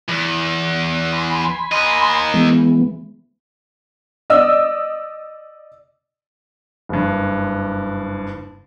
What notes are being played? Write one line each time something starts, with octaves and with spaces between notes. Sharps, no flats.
E2
G#5 B5 C6
A#3 D#5
E3 G#3 B3
D5 D#5 D#6 E6
F#1 G2